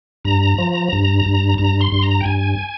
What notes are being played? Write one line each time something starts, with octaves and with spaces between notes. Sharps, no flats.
G2 A#5
F3
G2
G2
G2 A#5
C6
G2
A#5
G5
G2 G#5